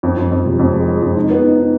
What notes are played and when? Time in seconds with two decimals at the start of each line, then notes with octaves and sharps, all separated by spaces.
0.03 F2
0.17 F2
0.31 F2
0.46 C3
0.59 F2
0.74 G#3
0.88 G#3
1.02 F2
1.16 D#4
1.30 B3
1.44 D#4
1.58 D#4